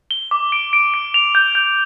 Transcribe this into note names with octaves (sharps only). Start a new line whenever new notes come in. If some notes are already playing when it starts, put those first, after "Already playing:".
G7
D6
D7
D7
D7
F7
G6
G6